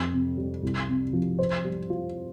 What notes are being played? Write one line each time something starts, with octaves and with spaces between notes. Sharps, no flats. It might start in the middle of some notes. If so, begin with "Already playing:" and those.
Already playing: F2
C3
G3
C2
C3
F3
C5
G3
F4